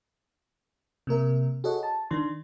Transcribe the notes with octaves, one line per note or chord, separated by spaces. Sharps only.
C3 A#3 A#4 E5
F#4 G#4 A4 C#5 D#5 F#5
A5
D#3 D4 C6